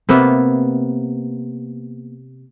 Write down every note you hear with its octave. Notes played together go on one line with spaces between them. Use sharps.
C3 A#3 B3 E5